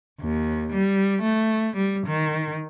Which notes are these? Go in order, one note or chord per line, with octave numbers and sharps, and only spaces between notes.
D#2
G3
A3
G3
D#3